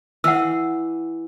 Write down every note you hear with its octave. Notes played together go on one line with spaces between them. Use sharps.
E3 F#5 E6